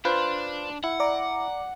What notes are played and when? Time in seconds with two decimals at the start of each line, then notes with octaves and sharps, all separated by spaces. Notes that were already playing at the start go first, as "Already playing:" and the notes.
0.05 D4 F4 B4 C5
0.84 E4 F#5
1.00 D5 A#5 D6